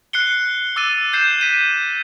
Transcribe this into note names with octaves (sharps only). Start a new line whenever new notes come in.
F#6 C7 C#7 G7
D6 E6 A6 D#7
G6 C7 E7
B6 D#7